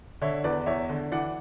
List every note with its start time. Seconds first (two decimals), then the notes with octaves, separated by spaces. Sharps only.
0.21 D3 C#5 E5
0.44 E2 B4 D5
0.66 E2 C#5 E5
0.89 D3
1.12 E3 D5 F#5